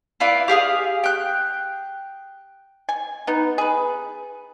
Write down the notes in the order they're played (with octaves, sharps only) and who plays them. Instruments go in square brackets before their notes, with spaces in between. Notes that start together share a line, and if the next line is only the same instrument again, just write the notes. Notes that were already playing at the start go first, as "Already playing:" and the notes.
[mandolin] E4 F4 B4 D5
G4 G#4 F5 D#6
G5 F#6
[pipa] G#5
B3 D#4
G#4 B4